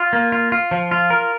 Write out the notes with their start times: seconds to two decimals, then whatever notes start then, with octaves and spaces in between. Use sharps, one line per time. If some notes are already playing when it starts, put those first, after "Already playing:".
Already playing: F4
0.13 A#3
0.32 F4
0.52 F4
0.71 F3
0.91 F4
1.10 A#4